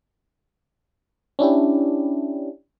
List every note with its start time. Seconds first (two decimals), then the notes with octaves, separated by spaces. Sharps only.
1.39 C#4 D4 E4 G4